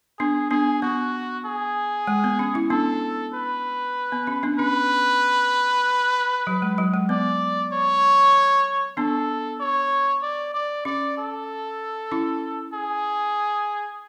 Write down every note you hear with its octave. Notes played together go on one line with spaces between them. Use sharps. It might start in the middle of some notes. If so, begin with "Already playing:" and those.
B3 D4 G#4
B3 D4 G#4
B3 F#4
G#4
G#3
B3
C#4
C#4 E4
B3 D4 A4
B4
B3
C#4
B3 D4
C#4 B4
F#3
G#3
F#3
G#3
B3 D5
C#5
B3 D4 A4
C#5
D5
D5
C#4 D5
A4
C#4 E4
G#4